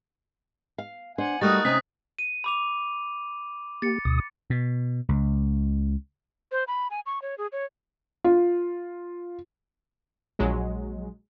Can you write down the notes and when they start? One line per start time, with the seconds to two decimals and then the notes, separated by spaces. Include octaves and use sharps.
0.78 F5
1.18 D4 C5 F#5 G#5
1.41 G3 A3 D#4 F#4 A#4 D#6 F#6 A6
1.65 C3 C#4 D#4 D#5 B6
2.19 D#7
2.44 B5 D6 F7
3.82 A#3 G4 A6 C#7
4.05 D2 B2 D#6
4.50 B2
5.09 C#2
6.52 C5
6.68 B5
6.91 G#5
7.06 C#6
7.22 C#5
7.38 G#4
7.52 C#5
8.24 F4
10.39 A#1 F#3 G#3